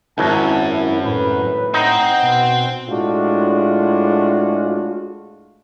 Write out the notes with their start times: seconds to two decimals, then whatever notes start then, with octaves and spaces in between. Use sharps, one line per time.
0.18 G#1 C#2 F#2 F#3 E4 A5
1.05 A2 B4
1.74 C4 D#4 C5 F#5
2.23 B2
2.88 A2 G#3 D4 F4 F#4